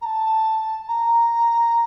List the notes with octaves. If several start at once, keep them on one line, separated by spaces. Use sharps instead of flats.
A#5
A5
A#5